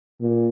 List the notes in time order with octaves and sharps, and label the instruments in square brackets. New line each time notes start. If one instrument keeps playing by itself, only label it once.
[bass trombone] A#2